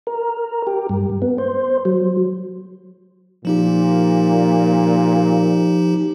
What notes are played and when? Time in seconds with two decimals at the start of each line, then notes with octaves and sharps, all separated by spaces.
0.07 A#4
0.67 G4
0.89 G2
1.22 B3
1.38 C5
1.85 F#3
3.45 A#2 F3 D#4 G4